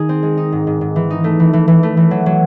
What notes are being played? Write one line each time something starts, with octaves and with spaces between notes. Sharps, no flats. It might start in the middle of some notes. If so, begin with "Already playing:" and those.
Already playing: D#3 D#4 G#4
C4
G#3
D#4
G#2
G#2
G#2
E3
D#4
A3
E3
E3
E3
A3
E3
F#3
F#3